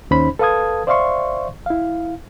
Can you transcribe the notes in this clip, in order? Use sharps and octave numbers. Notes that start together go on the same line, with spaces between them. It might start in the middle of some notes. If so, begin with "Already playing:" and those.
D#2 C#4 D#4 C5 B5
A4 B4 F5 A5 D#6 G#6
C5 D5 E5 F5 C6 C#6
E4 F5